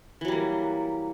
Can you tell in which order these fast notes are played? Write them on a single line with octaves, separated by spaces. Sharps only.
E3 F#3 G3 A#3